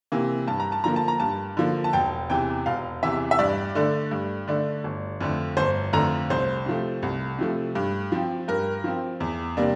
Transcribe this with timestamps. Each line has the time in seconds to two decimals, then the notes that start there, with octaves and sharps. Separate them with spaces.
0.12 C3 E3 A#3
0.47 G2 A5
0.60 A#5
0.72 A5
0.84 D3 F3 A#3 A#5
0.96 A5
1.08 A#5
1.20 G2 A5
1.57 D3 F3 A#3
1.84 A5
1.93 E1 G5
2.30 E2 C3 E3 G5
2.66 E1 F5
3.03 E2 C3 E3 E5
3.31 E5
3.39 G2 D5
3.75 D3 A3 D4
4.11 G2
4.48 D3 A3 D4
4.84 G1
5.21 F2 D3 A3
5.57 G1 C5
5.93 F2 D3 A3 A#5
6.30 C2 C5
6.66 C3 F3 A3
7.03 C2
7.39 C3 F3 A3
7.75 G2
8.12 F3 C4
8.48 G2 A#4
8.84 F3 C4
9.20 E2
9.57 C3 G3 A#3 D4